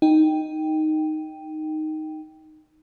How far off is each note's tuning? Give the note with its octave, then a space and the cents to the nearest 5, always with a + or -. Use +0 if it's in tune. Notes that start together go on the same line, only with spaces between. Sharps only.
D#4 +0 G5 +0